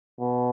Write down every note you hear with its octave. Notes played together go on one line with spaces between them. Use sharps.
B2